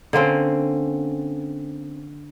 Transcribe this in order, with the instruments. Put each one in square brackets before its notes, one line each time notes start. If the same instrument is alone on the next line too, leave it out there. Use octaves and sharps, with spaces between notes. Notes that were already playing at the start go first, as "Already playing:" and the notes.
[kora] D3 A#3 C4 C#4